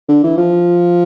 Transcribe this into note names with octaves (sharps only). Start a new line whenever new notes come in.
D3
E3
F3